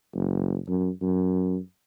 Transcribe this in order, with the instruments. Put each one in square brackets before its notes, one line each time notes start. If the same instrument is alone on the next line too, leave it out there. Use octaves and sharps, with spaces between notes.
[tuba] F#1
F#2
F#2